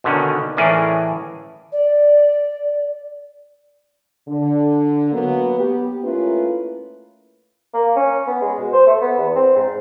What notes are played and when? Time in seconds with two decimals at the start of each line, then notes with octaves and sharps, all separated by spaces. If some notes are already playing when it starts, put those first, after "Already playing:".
0.04 B2 D3 D#3 C#4
0.57 A2 E3 C#4 G#4 A#4 D5
1.72 D5
4.28 D3
5.12 F#3 A#3 B3
5.58 B3 G4
6.03 A3 A#3 C#4 E4 F4 B4
7.74 A#3
7.96 C#4
8.27 B3
8.41 G#3
8.59 B2
8.73 C5
8.87 A3
9.02 B3
9.18 E2
9.35 C4
9.56 G#2